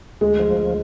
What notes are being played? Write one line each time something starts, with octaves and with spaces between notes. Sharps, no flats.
D2 G#3
F3
D2